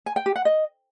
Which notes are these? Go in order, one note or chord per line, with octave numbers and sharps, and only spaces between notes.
G#5
G5
G4
F#5
D#5